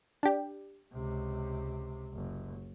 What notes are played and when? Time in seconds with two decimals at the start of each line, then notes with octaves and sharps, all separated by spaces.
0.23 D4 G4
0.94 C#2 C3
2.14 F#1